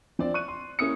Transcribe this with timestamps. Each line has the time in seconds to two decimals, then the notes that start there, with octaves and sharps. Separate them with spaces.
0.19 F3 C4 D4 C5 D5
0.34 C#6 F#6 D#7
0.48 C6
0.79 A#3 C#4 E4 D#6 C#7